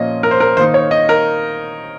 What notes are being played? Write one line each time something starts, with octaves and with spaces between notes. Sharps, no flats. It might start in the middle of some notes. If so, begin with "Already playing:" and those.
Already playing: A#2 F3 A#3 C#4 D#5
A#4
C5
A#4
D#3 A#3 D#4 C5
C#5
D#5
A#4